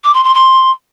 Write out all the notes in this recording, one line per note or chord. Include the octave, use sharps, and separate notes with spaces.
D6
C6
C6
C6